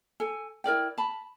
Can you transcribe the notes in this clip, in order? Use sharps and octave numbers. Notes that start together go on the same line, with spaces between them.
A4 G#5
E4 A#4 D5 G5
A5 B5